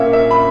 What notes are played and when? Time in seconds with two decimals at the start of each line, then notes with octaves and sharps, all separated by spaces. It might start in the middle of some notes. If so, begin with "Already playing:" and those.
Already playing: A#2 A#3 C#4 E5
0.13 E5
0.31 B5